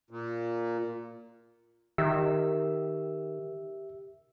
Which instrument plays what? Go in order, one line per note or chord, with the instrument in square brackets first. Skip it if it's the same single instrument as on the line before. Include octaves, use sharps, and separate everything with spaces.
[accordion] A#2
[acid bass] D#3 [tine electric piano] G4 E5 E6